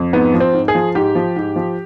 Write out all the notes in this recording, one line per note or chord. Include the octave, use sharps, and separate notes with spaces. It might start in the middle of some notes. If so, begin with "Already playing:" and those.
Already playing: F2
G#2 B3
F3
C4
G#2
G#4
F3
G#2 G4
F3
G#2
F3